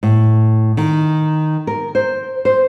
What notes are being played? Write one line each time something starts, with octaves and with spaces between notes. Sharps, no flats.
A2
D#3
A#4
C5
C5